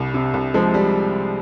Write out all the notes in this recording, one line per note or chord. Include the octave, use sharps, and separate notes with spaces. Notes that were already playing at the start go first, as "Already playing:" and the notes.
Already playing: C2 G3
C3
C2
F3 G#3
G3